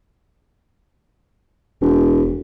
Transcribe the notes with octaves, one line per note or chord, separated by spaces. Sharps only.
E1